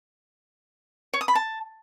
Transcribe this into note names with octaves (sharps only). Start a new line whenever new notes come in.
C#5
D#6
B5
A5